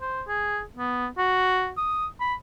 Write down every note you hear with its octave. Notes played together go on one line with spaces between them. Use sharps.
C5
G#4
B3
F#4
D#6
B5